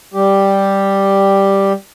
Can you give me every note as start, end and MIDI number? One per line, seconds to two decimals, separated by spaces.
0.14 1.73 55
0.14 1.73 67